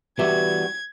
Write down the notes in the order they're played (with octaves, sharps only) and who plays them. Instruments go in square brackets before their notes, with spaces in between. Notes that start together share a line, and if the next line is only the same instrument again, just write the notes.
[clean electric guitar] E3 G3 F#4 [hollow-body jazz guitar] B3 G4 E5 [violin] G#6